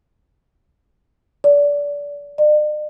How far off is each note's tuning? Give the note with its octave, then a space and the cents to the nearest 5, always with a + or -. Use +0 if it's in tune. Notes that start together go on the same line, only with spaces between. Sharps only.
D5 -30
D5 +45